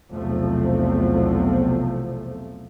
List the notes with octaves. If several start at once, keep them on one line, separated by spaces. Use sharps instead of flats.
B1 E2 C3 F3 A3